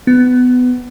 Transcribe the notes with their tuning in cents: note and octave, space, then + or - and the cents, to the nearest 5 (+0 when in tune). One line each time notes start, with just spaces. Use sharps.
B3 +20